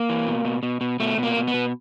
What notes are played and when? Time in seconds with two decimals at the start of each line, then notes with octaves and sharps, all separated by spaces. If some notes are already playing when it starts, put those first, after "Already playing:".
Already playing: A#3
0.09 E3
0.27 B2
0.45 B2
0.63 B2
0.81 B2
1.00 B2 A3
1.18 B2
1.23 A#3
1.36 B2
1.48 B3
1.54 B2